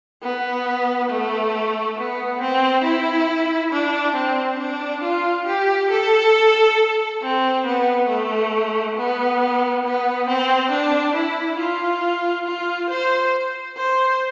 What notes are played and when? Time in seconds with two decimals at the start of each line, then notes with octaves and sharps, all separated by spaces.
0.23 B3
1.10 A3
1.98 B3
2.41 C4
2.85 E4
3.73 D4
4.16 C4
4.60 D4
5.03 F4
5.47 G4
5.91 A4
7.23 C4
7.66 B3
8.09 A3
8.97 B3
9.85 B3
10.28 C4
10.71 D4
11.16 E4
11.59 F4
12.46 F4
12.89 C5
13.77 C5